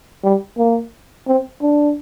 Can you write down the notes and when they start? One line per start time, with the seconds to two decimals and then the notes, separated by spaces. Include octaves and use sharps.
0.23 G3
0.58 A#3
1.27 C4
1.61 D4